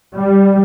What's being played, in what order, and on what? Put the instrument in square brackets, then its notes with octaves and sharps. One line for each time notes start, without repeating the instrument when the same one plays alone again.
[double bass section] G3